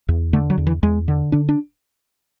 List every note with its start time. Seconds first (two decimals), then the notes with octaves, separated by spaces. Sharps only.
0.09 E2
0.33 D3 A3
0.50 F#3
0.58 E2
0.67 E3
0.83 E2 G#3
1.08 D3
1.32 D3 D4
1.49 D4